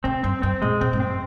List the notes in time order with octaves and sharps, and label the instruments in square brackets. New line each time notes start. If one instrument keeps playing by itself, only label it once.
[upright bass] C3 [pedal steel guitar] C4
[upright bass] F#2 [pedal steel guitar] C4
[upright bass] F#2 [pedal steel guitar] C4
[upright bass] A#2 [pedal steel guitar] G#3
[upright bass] A#2 [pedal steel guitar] C4
[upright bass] G#2
[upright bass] F#2 [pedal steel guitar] C4